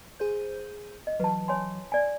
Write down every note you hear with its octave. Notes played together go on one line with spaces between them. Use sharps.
G#4 C5 G6
D#5
E3 F#3 B4 A5
C#5 G#5 C6
D5 G#5